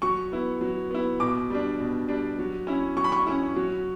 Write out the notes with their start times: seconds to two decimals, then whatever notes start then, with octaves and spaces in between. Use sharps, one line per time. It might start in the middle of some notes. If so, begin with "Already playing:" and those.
0.02 F#3 C#6
0.32 B3 E4
0.61 F#3
0.91 B3 E4
1.20 B2 D6
1.50 G3 D4
1.80 B2
2.09 G3 D4
2.39 F#3
2.67 C#4 E4
2.97 F#3 C#6
3.04 B5
3.12 C#6
3.27 C#4 E4
3.56 F#3